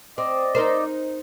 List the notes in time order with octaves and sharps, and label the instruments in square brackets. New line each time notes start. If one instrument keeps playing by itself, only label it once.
[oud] C4 [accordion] D5 D#5
[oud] D#4 A#4 C5